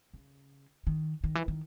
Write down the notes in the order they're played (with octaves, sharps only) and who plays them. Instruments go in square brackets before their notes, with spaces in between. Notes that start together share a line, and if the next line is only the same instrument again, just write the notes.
[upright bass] C#3
D#3
D#3
E3
D#3